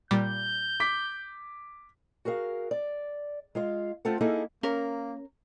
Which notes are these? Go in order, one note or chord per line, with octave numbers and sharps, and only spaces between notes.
A#2 G3 G6
D6 B6
F#4 G#4 A#4 F5
D5
G#3 F4 F5
A3 C4 F4 A4 F#5
A#3 D#4 E4 G#4 A4
A#3 C#4 A#4